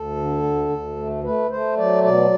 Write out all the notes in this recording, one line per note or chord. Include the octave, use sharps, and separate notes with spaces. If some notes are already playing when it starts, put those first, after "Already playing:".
Already playing: D2 A4
D3
D2
D2
A3
A3 B4
A3 C5
F#3 D5
B2 D5